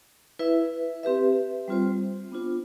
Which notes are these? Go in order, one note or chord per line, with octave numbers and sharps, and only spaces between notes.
E4 B4 E5
C4 G4 B4 E5
G3 C4 F4 C5
B3 D4 F4 C5